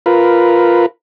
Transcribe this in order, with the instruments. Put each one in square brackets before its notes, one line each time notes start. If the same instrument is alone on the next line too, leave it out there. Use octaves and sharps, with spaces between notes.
[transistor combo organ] F4 A#4 B4